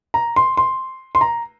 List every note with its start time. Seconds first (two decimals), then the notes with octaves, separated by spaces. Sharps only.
0.14 A#5
0.36 C6
0.57 C6
1.15 C6
1.21 A#5